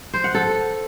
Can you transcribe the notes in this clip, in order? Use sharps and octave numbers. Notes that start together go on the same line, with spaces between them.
C5
F#5
A4